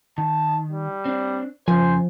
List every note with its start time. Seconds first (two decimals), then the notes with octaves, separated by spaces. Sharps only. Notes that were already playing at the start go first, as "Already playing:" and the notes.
0.18 D#3 A5
0.71 G3
1.05 C4 D4
1.68 F2 C#3 F3 C5 G#5